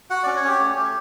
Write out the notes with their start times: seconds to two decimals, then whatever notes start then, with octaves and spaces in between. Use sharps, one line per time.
0.10 F#4 F#5
0.23 C#4 D5
0.36 C#5
0.44 C#4 G4
0.60 A3
0.77 A3